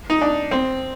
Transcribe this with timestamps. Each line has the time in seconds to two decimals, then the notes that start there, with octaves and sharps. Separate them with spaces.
0.10 D#4
0.22 D4
0.51 C4